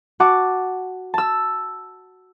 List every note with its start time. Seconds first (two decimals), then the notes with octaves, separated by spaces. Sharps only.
0.20 F#4 F#5 A5 D6
1.14 A5 E6